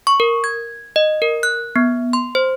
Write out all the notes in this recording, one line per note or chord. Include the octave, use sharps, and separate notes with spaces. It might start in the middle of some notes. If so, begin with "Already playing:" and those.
C#6
A#4
G#6
D#5
A#4
F#6
B3
C6
C5